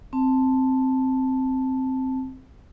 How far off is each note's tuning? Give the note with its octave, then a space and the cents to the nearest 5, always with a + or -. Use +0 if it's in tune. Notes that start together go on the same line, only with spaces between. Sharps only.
C4 +0 A5 +0